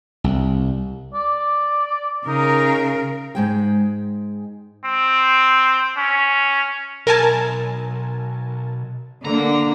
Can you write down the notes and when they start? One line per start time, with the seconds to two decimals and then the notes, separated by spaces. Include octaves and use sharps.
0.24 C2
1.14 D5
2.27 C#3 D#4 A#4
3.35 G#2 G#3 G5
4.85 C4
5.97 C#4
7.07 B1 A#4 G#5 A5
9.25 D3 A#3 A#5